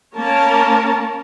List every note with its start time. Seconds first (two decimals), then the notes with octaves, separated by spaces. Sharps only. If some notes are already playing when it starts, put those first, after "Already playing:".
0.18 A#3 C#4 A#4 C#5 A5